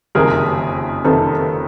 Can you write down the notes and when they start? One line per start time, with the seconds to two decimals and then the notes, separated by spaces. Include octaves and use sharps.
0.15 F#1 F2 C3 D#3 G#4 A#4
1.04 F#1 F2 C3 D#3 A4 B4